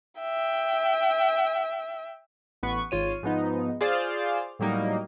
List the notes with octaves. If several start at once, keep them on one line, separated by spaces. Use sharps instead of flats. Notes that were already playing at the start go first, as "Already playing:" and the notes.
E5 G5
A1 B3 B4 C#6
G#1 F4 C#5 D#7
G#2 F3 B3 D#4
F4 G#4 C5 D5 F5
A2 F#3 G3 A#3 D#4